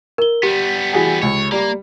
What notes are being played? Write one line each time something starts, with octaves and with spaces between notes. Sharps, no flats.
A#4 G7
G3 B3 G4
E3 F#4 G#4
C#2 C#5
G3 A#3